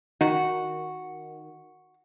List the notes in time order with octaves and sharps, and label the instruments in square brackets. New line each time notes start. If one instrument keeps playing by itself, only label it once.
[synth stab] D#3 [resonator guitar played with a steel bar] F#4